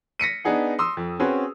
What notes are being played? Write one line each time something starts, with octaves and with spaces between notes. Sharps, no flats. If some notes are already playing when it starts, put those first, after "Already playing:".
A#6 B6 C#7 D#7
B3 D4 D#4 G#4 F#5
C6 D#6 E6
F2
C4 C#4 F#4 G#4 B4